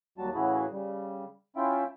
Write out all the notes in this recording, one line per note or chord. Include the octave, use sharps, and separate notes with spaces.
D#2 F#3 G3 F#4 A5
A2 C#3 E3 E4 F#4 G#4
C#3 G3
C#4 E4 F4 E5 G5